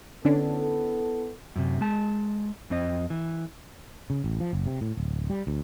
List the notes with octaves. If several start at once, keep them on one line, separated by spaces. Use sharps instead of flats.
D3 B3 C#4 D4 E4 A4
F#2 C3
G#3 A5
F2 C4 D#5
E3
C#3
A1
F3
F#1
C3
A2
D1
G3
D2